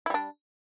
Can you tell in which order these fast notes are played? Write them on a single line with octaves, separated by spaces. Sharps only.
E4 G3 D4